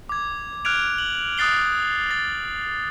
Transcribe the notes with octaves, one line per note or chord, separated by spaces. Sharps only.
D6 G#6
F6 F#6 G#6 D7 F7
F#7
D#6 F#6 A6 C7 G7
A6